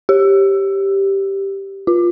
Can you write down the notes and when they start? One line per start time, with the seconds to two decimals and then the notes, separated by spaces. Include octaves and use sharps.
0.09 G4
1.87 F4